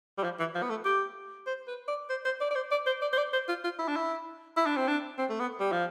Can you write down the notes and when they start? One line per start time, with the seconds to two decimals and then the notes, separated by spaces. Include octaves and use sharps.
0.18 G3
0.24 F3
0.40 E3
0.55 F3
0.63 B3
0.70 A3
0.85 G4
1.47 C5
1.68 B4
1.88 D5
2.10 C5
2.25 C5
2.41 D5
2.51 D5
2.56 C5
2.72 D5
2.87 C5
3.02 D5
3.13 C5
3.18 D5
3.33 C5
3.48 F4
3.64 F4
3.79 E4
3.88 D4
3.96 E4
4.57 E4
4.66 D4
4.77 C4
4.88 D4
5.18 C4
5.30 A3
5.40 B3
5.60 G3
5.72 F3